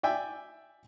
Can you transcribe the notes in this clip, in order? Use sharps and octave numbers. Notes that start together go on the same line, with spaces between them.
D5 E5 G5 G#5